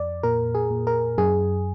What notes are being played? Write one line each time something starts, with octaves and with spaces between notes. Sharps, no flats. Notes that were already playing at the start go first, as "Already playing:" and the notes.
Already playing: F2 D5
A#2 A#4
G#4
A#2
A#4
F#2 G#4